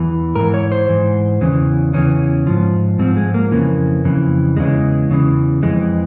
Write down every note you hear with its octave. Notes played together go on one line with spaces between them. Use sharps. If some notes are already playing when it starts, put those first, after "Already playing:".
Already playing: E2 E3
G#2 E3 A#4
C#5
C5
G#2 E3
E2 C#3 E3
E2 C#3 E3 C#4
G#2 F3
G#2 F3 C4
G#3
A#3
F2 C#3 E3 A#3
F2 C#3 E3
E2 C#3 E3 G#3
E2 C#3 E3
F2 E3 G#3